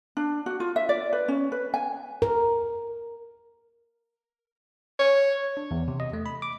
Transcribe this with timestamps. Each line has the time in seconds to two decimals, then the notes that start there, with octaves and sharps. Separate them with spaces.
0.17 D4
0.46 F#4
0.60 F4
0.76 E5
0.89 D5
1.13 B4
1.28 C#4
1.52 B4
1.74 G#5
2.22 A#4
4.99 C#5
5.57 D4
5.71 E2
5.88 C3
6.00 D#5
6.13 A3
6.26 B5
6.42 D6